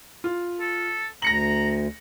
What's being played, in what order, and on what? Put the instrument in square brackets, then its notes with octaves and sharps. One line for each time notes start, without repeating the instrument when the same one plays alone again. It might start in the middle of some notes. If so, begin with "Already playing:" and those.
[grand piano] F4
[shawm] A4
[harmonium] D2 [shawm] A#5 [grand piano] A#6 C#7 F#7